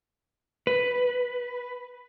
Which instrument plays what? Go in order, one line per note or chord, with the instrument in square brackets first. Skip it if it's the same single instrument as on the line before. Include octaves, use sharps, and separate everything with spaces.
[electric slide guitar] B4